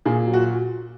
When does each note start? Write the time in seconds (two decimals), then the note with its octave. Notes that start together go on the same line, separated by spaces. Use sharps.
0.05 A#2 G#4
0.27 F#3
0.33 F#4